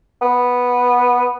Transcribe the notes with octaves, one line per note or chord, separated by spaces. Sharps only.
B3